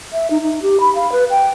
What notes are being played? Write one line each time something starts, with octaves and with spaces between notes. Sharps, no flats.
E5
D#4
D#4
G4
B5
F5
B4
G5